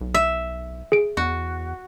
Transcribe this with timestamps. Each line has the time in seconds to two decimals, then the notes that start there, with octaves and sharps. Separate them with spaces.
0.01 B1
0.14 E5
0.92 G#4 D7
1.17 E2 F#4